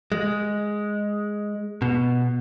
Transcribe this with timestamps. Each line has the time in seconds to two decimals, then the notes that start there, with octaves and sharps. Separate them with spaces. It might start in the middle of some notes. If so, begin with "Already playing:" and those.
0.12 G#3
1.82 B2